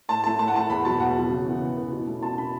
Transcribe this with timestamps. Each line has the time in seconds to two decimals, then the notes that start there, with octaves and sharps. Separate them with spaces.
0.09 A2 A5
0.24 A3 E4 A5
0.39 A2 A5
0.48 F#5
0.54 A3 E4 A5
0.70 E2 B5
0.85 B2 F#3 A5
1.00 E2 F#5
1.16 B2 F#3
1.31 C#3
1.46 E3 B3
1.62 C#3
1.77 E3 B3
1.92 B2
2.07 A3 C#4 E4
2.22 B2 A5
2.37 A3 C#4 E4 B5